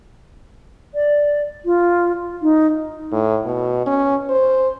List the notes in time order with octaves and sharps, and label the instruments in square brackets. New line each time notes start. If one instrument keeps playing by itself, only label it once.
[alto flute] D5
F4
D#4
[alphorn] A2
B2
C#4
C5